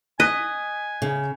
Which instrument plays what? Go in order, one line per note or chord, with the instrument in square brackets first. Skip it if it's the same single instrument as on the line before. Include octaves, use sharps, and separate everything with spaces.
[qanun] D#5 [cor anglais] G#5 [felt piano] F#6 B6
[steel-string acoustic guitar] C#3